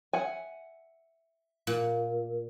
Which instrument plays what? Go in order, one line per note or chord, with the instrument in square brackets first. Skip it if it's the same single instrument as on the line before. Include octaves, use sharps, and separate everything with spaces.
[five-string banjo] E5 F#5 G#5
[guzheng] A#2